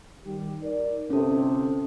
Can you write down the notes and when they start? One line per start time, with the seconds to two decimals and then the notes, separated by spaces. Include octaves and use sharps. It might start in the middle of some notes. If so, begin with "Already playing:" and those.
0.25 D#3 G3 G4
0.62 D#4 A#4 D5
1.10 G1 C3 C#4 A4